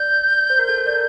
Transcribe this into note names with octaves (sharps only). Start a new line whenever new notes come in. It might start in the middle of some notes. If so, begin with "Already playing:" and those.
Already playing: D5 G6
C5
A#4
A4
A#4
D5